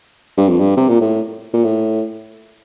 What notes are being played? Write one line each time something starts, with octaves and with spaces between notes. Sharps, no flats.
G2
F2
G2
C3
A#2
A2
A#2
A2